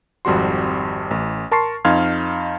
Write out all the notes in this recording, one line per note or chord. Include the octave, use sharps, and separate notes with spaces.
G#1 F2 G3 F#4 C6
A1
A#4 A5 C6 C#6 C7
F2 D#4 F5 C6 F6 G#6